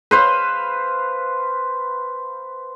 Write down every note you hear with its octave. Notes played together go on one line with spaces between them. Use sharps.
B4 C5 F5